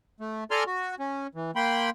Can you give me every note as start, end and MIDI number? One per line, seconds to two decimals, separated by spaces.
0.20 0.44 57
0.51 0.64 69
0.51 0.64 74
0.51 0.64 80
0.51 0.64 82
0.51 0.64 84
0.51 0.64 89
0.67 0.95 66
1.00 1.27 61
1.35 1.51 52
1.56 1.90 58
1.56 1.90 79
1.56 1.90 83
1.56 1.90 84